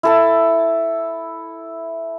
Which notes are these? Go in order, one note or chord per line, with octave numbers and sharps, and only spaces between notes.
E4 A4 A5